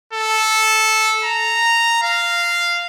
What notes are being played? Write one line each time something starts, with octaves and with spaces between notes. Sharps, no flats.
A4
A#5
F5